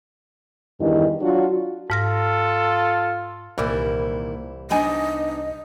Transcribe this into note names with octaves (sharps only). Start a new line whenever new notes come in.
E2 G2 D#3 E3 E4 D#5
F#3 D4 F4 F#4
G#2 F4 A4 F6 A#6
C2 A#2 D#3 E3 G3 E4
B3 D4 D#4 D#5 G#5 B5